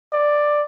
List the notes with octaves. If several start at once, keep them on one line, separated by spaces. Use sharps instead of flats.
D5